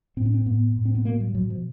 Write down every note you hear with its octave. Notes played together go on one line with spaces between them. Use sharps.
A2 C4
C#4
C4
A2 B3
A2
C4
B3
B2 A#3
G3
B2 F#3
F3